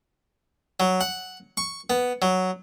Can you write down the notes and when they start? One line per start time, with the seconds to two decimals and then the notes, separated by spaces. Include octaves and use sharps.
0.80 F#3
1.01 F#5
1.57 C#6
1.90 B3
2.22 F#3